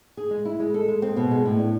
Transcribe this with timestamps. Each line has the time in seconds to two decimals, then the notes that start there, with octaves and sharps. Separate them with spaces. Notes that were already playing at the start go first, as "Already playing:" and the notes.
0.17 G#4
0.31 G#3
0.45 E4
0.60 G#3
0.74 A4
0.88 G#3
1.02 C4
1.16 B2
1.31 G#3
1.45 A2
1.59 D4